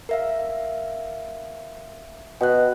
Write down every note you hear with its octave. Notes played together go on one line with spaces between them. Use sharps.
A#4 E5 F5
B2 G5 F#6